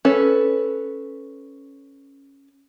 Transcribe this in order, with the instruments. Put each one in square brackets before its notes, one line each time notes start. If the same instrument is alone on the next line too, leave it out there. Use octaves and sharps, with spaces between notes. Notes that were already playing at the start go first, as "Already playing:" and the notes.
[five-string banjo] C#4 A4 B4